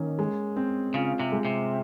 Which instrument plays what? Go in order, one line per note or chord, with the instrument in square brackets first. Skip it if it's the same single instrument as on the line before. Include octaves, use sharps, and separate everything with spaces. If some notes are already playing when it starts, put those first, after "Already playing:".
Already playing: [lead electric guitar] D#3 [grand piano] A#3 C#4
[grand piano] G#3
C4
[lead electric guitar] C#3 [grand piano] F4
[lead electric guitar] C3
[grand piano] G#3
[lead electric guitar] C3